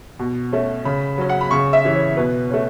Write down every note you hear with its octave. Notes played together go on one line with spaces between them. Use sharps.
B2
A3 C#4
C#3 B5
F#3 C#4
F#5
B5
C#3 C#6
E5
E3 C#4
C#5
B2 B4
A3 C#4